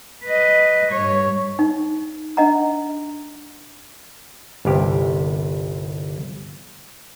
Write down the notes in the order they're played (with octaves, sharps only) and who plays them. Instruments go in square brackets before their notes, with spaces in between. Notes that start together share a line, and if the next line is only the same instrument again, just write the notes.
[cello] B4 D#5
G2 C#5
[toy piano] D#4
D4 D#5 F#5 A#5
[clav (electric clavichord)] G1 C2 G4